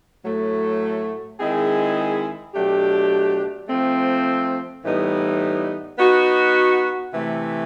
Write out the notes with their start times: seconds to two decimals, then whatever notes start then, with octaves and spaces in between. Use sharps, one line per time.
0.24 A2 F#3 A3
1.39 D#3 G#3 C4 E4 G#4
2.54 B2 F#3 A3 D4 G4
3.69 F3 A3 C4
4.83 A2 E3 G3 B3 D#4
5.98 B3 D#4 F#4
7.14 C3 E3 A3